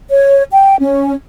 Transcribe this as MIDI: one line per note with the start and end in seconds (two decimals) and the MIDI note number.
0.10 0.43 73
0.52 0.75 79
0.81 1.13 61